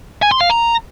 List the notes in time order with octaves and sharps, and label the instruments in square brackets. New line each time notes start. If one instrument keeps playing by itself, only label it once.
[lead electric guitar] G#5
C6
F5
A#5